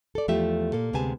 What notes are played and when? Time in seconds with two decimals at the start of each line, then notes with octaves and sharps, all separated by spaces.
0.15 A4 D5
0.28 E2 F3 A3 F4 G4 E5
0.73 A#2 A#3 A4
0.93 D2 C3 G#3 B3 G#5 A5